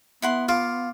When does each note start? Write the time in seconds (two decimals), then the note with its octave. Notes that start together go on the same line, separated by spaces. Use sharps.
0.22 B3 E4 F#5 C6
0.49 F4 D6